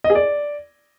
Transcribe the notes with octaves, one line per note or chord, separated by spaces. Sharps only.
D#5
G#4
D5